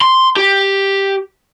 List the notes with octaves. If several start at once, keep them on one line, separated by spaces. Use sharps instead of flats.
C6
G4